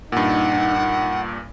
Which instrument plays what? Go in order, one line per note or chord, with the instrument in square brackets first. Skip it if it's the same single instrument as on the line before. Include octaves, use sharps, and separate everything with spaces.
[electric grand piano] G2 A#2 [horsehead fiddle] D#4 [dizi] F#5